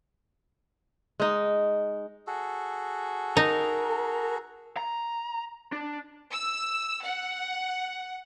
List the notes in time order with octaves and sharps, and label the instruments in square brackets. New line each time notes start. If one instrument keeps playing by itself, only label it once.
[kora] G#3 D#4
[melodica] F#4 G#4 A4
[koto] D#4 [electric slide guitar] A#4
[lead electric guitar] A#5
D4
[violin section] E6
F#5